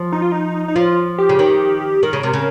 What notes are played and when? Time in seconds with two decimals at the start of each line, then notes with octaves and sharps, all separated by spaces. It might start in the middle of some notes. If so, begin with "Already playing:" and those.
Already playing: F3
0.12 D#4
0.22 F4
0.32 D#4
0.68 D#4
0.76 F3 F4
1.18 G4
1.29 C#3
1.39 D#3
2.03 D#3 A#4
2.13 C#3
2.23 C3
2.33 C#3